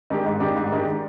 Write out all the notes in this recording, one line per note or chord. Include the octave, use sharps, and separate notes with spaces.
D#3 G#3 D4 G4
G#2
D#3 G#3 D4 G4
G#2
D#3 G#3 D4 G4